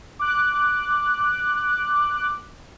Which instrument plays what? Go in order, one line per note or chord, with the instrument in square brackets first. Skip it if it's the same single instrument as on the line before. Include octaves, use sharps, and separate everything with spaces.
[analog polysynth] D6 F#6